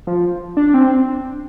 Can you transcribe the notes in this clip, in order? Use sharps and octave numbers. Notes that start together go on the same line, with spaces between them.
F3
D4
C4